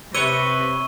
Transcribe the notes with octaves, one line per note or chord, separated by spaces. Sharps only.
C3 B4 C#5 E6 D#7 G7